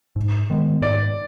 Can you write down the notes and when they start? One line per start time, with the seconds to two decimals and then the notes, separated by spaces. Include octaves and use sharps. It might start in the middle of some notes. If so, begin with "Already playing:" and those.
0.16 G#2
0.50 D#3 G#3 B3
0.82 G#2 D5